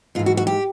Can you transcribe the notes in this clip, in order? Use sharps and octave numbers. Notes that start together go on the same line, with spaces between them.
G#2 E3 F4
F#4
F#4
G4